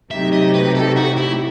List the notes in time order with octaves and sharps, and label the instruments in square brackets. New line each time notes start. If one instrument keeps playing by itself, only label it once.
[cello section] C3 F#3 A3 D#4 G4 [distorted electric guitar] E5
[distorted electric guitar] D#5
B4
A4
F#4
E4